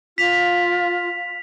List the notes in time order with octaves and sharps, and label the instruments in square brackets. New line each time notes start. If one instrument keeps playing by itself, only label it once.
[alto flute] F4 [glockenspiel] B6 F7